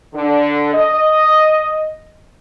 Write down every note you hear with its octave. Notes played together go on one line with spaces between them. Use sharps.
D3
D#5